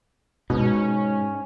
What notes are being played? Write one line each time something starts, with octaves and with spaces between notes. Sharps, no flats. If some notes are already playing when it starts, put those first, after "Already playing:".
G#2 B2 C#4